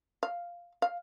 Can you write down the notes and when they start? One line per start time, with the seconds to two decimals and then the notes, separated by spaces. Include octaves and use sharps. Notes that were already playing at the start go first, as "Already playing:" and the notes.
0.23 F5
0.82 F5